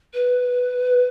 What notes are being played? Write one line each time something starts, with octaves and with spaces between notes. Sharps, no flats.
B4